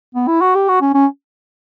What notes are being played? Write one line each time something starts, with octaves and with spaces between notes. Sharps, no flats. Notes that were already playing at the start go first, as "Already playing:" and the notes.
B3
E4
F#4
G4
F#4
C#4
C#4